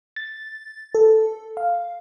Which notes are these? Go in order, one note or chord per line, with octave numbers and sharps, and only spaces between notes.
A6
A4
F5